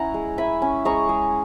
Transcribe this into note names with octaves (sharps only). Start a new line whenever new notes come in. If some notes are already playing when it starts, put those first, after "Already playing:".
Already playing: C#4 E4 F#5 G#5 A#5
G#3
E4 G#5 B5
C#4
G#3 A#5 C#6
G#3